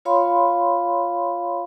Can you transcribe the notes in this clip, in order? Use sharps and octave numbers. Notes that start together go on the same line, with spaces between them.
F4 C#5 F5 B5 C6